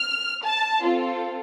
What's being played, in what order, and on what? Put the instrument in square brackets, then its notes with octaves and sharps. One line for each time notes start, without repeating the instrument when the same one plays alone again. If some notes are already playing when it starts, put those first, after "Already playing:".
Already playing: [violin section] F6
A5
C4 F4 A4